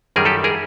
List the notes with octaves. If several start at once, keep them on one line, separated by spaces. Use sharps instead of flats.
F#2 D#3 G3 G#4 A#4
G4 A4
G#4 A#4